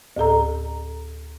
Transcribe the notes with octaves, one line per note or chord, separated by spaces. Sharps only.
D2 A2 A4 A#5